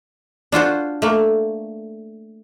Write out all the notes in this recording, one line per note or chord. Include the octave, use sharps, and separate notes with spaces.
D4 F4 F#4 C5
A3 A#3